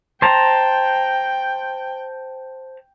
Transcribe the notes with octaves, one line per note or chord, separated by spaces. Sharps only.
C5 G5 A5 A#5